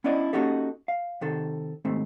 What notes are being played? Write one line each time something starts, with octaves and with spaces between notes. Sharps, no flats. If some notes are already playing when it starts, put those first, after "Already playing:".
B3 C#4 D4 E4 D5 D#5
A#3 C#4 D#4 F#4 G4 A4
F5
C3 D#3 A4
D#2 G#2 A3 C4